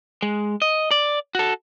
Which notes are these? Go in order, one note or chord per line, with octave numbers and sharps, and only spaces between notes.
G#3
D#5
D5
F#4 A4